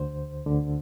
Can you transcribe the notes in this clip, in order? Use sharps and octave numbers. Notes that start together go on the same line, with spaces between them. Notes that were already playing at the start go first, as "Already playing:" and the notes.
Already playing: D2 D3 C5
D2 D3